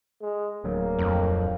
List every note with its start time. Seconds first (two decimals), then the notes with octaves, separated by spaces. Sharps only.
0.22 G#3
0.64 D1 D2 F#3 A#3
0.99 F2